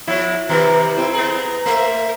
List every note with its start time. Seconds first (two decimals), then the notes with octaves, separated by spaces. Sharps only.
0.07 F3 E4
0.49 C3 D#3 G3 C4 A#5
0.97 C4 E4
1.13 B3 G#4 A#5
1.66 A3 C5 E5